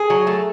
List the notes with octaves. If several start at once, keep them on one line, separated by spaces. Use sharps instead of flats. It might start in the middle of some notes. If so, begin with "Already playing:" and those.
Already playing: G#4
F#3
A3